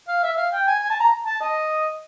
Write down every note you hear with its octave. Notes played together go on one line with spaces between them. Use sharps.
F5
E5
F5
G5
G#5
G#5
A5
A#5
A5
D#5